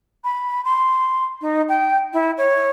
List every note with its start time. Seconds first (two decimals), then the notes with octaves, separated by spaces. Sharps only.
0.24 B5
0.64 C6
1.41 D#4
1.68 G5
2.13 E4
2.37 C#5